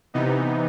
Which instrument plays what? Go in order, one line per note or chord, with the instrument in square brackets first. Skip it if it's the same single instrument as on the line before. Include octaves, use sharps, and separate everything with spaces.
[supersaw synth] C3 E3 B3 D#4